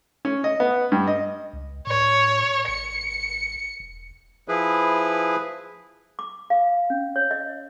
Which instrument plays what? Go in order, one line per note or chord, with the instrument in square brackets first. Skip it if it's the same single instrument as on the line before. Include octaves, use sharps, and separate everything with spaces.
[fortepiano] C#4
D#5
B3
G2
D#5
[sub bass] C#2
[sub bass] A2 [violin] C#5
[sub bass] G#1 [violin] C#7
[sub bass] E1
[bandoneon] F3 E4 G#4 B4
[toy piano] D6
F5
C#4
C#5
D#5